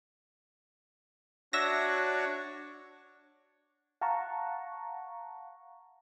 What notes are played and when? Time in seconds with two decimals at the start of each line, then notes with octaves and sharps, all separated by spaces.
1.53 D4 F#4 C#5 E5 A#6
4.01 F5 F#5 A5 A#5 C#6